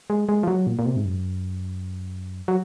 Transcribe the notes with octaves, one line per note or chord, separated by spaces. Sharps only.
G#3
G#3
F3
F#3
A#2
A#2
C3
G#2
F#2
F#3